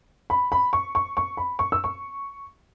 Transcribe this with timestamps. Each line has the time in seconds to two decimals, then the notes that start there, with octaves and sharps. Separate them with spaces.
0.30 B5
0.52 B5
0.73 C#6
0.95 C#6
1.17 C#6
1.37 B5
1.59 C#6
1.72 E6
1.84 C#6